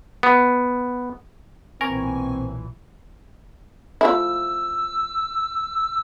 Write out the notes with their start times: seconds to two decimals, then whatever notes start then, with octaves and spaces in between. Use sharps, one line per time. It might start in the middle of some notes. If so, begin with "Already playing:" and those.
0.23 B3
1.81 B1 A#2 E3 C4 A#4 G#5 C#6
4.01 F3 A3 E4 E6